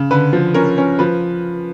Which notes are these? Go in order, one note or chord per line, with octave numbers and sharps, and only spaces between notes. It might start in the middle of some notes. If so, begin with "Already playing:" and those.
Already playing: C#3
D3 B4
F3
C#4 A#4
C#4
F3 B4